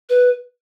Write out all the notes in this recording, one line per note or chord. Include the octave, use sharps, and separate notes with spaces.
B4